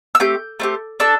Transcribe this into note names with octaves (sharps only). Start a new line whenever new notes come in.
E6
A3 C4 G4 G6
A3 C4 G4
D4 A4 E6